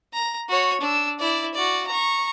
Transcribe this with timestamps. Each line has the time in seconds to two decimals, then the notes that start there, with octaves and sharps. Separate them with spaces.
0.13 A#5
0.48 F#4 C#5
0.81 D4 E6
1.19 E4 D5
1.54 F#4 D5
1.87 A#5 C#6